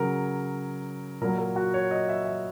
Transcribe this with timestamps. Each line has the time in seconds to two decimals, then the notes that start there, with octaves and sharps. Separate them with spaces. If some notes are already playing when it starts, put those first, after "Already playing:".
Already playing: C#3 F#3 A#4
1.22 A#2 F#3 A#4
1.38 A#4
1.56 F#4
1.74 C#5
1.91 D#5
2.09 E5
2.25 E5